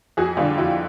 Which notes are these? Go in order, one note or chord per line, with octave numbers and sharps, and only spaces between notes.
F2 F#4 G#4
D3 G3 F4 G4
F2 E4 F#4